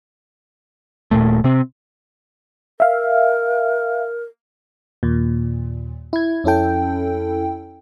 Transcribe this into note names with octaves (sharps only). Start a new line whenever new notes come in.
D#1 D#2 A#2 A3
C3 C4
A#4 E5 F5
D#2 A#2
E4 G#6
F2 C#4 E4 A4 G5